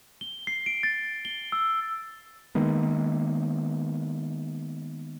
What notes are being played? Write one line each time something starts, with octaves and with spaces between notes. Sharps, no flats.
G7
C7
D7
A6
G7
E6
D#3 G#3 A#3 B3